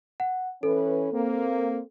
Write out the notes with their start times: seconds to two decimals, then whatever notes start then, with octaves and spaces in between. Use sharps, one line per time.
0.20 F#5
0.63 E3 C#4 A4 B4
1.13 A#3 C4